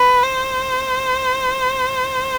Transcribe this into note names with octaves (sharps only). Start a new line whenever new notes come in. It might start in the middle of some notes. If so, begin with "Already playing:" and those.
Already playing: B4
C5